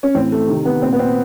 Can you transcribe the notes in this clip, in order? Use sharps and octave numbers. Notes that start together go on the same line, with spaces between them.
C#4
A2 E3 C4
A3
C3 D#3
B3
A#2 C4
B3
C4